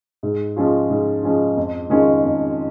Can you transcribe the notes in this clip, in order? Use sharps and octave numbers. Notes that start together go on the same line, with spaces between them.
G#2
F3 G#3 C#4 F4
G#2
F3 G#3 C#4 F4
F2
D#3 G#3 C#4 F4
F2